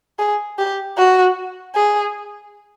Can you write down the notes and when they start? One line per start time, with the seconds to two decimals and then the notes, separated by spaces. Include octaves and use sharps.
0.19 G#4
0.58 G4
0.98 F#4
1.75 G#4